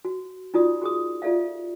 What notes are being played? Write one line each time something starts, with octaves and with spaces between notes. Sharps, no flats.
F#4
D#4 F4 F#4 D5 D#6
F#4 G#4 D#6
F4 G4 A4 D5 E5 F5